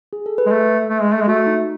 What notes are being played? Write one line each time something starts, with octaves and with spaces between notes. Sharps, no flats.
G#4
A4
B4
G#3
A3 A4
A3
G#3
A3
G#3
A3 F#4
D#4